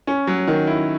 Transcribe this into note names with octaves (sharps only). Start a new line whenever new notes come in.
C#4
F#3
D#3
E4